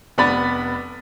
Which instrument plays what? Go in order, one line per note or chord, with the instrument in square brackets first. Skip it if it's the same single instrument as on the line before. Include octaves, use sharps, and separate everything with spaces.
[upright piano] F1 B3 D5 B5 A6